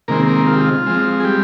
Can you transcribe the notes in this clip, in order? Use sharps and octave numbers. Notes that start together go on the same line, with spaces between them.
C3 D#3 G#3 A#3 C4 A#4
A#3 A#4
F4
G4
F4
F3 G#3 C4
G#4
G3 G4